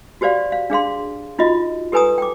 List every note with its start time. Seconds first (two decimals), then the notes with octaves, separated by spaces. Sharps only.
0.21 F#4 G4 C5 D5 F5
0.52 F5
0.70 D4 G#4 F5 C6
1.39 D#4 F4 F#4 D#5
1.92 G4 A4 B4 G#5 A#5 D#6
2.18 G5 D6